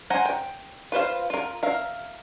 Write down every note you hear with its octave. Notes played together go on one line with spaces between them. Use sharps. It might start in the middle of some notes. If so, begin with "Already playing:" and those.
C5 F#5 G#5 A#5
G5
F4 B4 C5 F5
F4 A#4
A#4 E5 F5